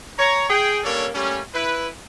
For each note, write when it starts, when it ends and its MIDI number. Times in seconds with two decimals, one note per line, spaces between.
0.19 0.48 73
0.19 0.48 82
0.49 0.79 68
0.49 0.79 79
0.83 1.09 55
0.83 1.09 58
0.83 1.09 61
0.83 1.09 62
0.83 1.09 69
0.83 1.09 73
1.15 1.40 55
1.15 1.40 57
1.15 1.40 58
1.15 1.40 61
1.54 1.88 64
1.54 1.88 71